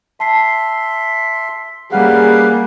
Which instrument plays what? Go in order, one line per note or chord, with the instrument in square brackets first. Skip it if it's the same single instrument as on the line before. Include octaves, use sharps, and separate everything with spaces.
[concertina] E5 C6 [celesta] A5 C7
[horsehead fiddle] G3 A#3 [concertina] C#4 B4 F5 [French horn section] G#4 [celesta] F#5